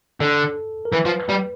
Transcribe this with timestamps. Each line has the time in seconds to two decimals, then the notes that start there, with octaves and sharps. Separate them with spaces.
0.21 D3 A4
0.85 A#4
0.92 E3 B4
1.05 F3
1.29 G3